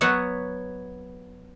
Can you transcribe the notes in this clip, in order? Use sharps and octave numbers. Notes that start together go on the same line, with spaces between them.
F#3 B3 B4 C#5 E5 F#5